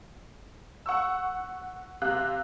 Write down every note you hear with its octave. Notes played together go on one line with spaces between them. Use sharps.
F#5 C#6 E6
C3 F5 F#6